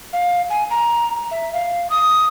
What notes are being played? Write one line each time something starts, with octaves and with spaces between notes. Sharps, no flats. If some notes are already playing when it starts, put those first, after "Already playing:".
F5
G#5
A#5
E5
F5
D#6